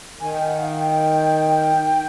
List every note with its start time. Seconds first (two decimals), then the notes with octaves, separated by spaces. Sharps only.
0.20 D#3 G#5
0.34 G5
0.47 F#5
0.61 F5
0.75 G5